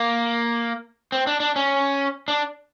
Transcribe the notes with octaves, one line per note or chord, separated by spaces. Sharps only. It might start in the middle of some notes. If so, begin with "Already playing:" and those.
Already playing: A#3
C4
D4
D4
C#4
D4